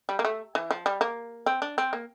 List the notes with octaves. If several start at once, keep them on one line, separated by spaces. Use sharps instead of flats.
G3
A#3
A3
E3
F3
G3
A#3
C4
D4
C4
A#3